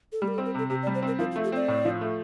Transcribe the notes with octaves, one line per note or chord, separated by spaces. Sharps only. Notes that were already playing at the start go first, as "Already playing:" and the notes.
A4
G3 G4
A#4
A4
C4
A#4
C3 A4
C3 G4
D5
G3
C5
C4 A#4
F3 A#4
F4
A3
G4
C4 D5
A2
F3
A3